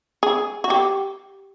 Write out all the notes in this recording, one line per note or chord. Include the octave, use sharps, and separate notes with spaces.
G#4
F#4
G4